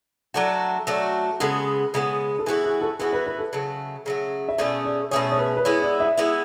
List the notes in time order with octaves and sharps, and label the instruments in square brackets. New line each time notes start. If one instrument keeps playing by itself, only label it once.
[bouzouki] F#3 A3 D4 F#4
F#3 A3 D4 F#4
[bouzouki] C#3 G#3 B3 [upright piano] A4
[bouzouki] C#3 G#3 B3
[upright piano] A4
[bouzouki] E3 B3 F#4 [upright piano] G#4
[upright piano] G#4
A4
[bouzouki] E3 B3 F#4 [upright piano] G#4
[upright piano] B4
B4
A4
[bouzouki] C#3 F#3 A3
C#3 F#3 A3
[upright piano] E5
[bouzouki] B2 A3 C#4 G#4 [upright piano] D5
[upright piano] D5
[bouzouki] B2 A3 C#4 G#4 [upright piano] C#5
[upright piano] C#5
B4
B4
[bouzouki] G#3 B3 E4 [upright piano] C#5
[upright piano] D5
E5
[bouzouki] G#3 B3 E4